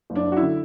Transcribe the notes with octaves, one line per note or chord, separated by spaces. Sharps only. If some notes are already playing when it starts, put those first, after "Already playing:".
F#1
D4
F#2
F#4
E4
D3